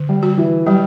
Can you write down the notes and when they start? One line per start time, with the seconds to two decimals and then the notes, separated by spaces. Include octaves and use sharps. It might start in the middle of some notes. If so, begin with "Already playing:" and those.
Already playing: D3
0.09 G3
0.23 F#4
0.38 E3
0.66 F#3 G3